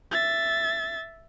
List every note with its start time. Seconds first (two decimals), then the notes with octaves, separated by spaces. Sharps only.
0.11 E5 A6